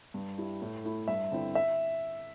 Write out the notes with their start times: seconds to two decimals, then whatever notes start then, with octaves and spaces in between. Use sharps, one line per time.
0.14 G2
0.38 G3 E4
0.62 A2
0.84 A3 E4
1.08 G2 E5
1.31 D3 C4 E4
1.55 E5